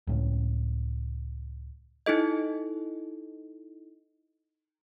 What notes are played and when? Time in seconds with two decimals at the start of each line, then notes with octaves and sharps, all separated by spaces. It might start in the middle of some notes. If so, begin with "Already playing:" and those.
0.07 C#2 A2 A3 C#4
2.06 D#4 E4 A4 D#5